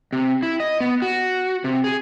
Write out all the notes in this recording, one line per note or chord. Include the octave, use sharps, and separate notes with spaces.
C3
E4
D#5
B3
F#4
C3
G#4